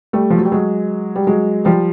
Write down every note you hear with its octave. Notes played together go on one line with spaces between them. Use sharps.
G3 A3
F3
F#3
G3
F#3 G#3
G3
F#3 G#3
F3 G3